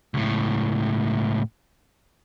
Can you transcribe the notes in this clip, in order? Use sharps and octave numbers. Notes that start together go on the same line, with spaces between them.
C#2 A2